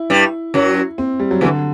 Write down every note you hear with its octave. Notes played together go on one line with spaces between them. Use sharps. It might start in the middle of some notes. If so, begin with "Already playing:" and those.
Already playing: E4
G2 G3
F#2 F#3
C4
G3
F#3
E2 D3 E3